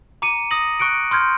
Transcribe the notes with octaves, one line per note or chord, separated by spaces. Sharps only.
A#5 D6 C#7 D#7
D#6 A#6 F#7
C#6 F#6 C#7 D7
C6 F6 G6 G#6